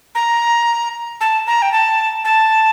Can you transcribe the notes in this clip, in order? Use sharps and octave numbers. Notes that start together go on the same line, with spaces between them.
A#5
A5
A#5
G5
A5
A5